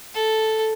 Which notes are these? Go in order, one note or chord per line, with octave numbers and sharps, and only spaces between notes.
A4